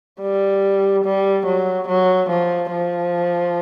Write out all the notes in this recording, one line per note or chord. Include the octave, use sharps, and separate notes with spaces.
G3
G3
F#3
F#3
F3
F3